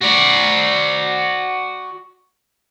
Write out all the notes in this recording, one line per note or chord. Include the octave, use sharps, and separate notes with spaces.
F#4 D5